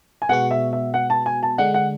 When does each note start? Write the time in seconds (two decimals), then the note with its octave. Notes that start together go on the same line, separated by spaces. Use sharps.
0.22 G#5
0.29 B2 G#3 B3 F#4 F#5
0.51 E5
0.73 E5
0.94 F#5
1.10 A5
1.26 G#5
1.43 A5
1.58 D3 G#3 D4 F#5
1.74 F#5